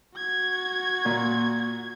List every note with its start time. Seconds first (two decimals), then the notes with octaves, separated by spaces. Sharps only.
0.17 F#4 G#6
1.05 A#2